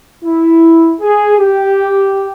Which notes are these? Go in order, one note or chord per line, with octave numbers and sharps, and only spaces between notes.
E4
G#4
G4